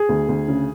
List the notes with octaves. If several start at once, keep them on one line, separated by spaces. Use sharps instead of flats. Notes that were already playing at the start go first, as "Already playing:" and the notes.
Already playing: G#4
D2
D2
C#3